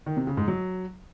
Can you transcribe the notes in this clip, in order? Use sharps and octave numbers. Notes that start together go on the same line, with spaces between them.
D#3
C3
C#3
G#2
F#3